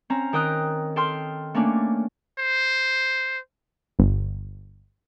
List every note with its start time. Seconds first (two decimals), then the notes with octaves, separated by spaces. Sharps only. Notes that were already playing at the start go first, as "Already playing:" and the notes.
0.10 C4 C#4 A#5
0.33 D#3 A#4 G5 D#6 F#6
0.96 A4 G5 C6 F6
1.54 A3 A#3 C#4 D4
2.39 C5
3.99 G1